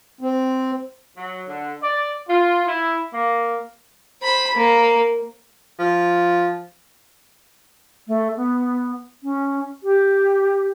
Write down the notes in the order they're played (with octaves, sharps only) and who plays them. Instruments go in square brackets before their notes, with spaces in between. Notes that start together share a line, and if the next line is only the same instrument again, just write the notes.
[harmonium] C4
[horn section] F#3
D3
D5
F4
E4
A#3
[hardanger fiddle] C5 B5
A#3
[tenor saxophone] F3
[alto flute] A3
B3
C#4
G4